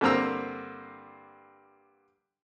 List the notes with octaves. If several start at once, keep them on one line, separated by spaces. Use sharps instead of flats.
G2 D3 A#3 C4 A#5 E6